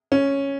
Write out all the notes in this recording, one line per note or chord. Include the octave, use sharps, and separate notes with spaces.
C#4